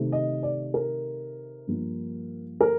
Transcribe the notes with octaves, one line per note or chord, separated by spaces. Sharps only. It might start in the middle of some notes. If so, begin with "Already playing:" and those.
Already playing: C3 D#3 A3
D#5
D5
A#4
G2 F3 A#3
A#4